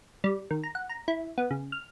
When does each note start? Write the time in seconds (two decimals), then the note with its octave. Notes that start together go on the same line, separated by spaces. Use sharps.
0.24 G3
0.51 D#3
0.63 A#5
0.75 F#5
0.89 A#5
1.08 E4
1.38 B3
1.51 C#3
1.72 F6